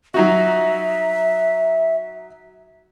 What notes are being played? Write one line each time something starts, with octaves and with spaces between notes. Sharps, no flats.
F#3 D#4 F#4 E5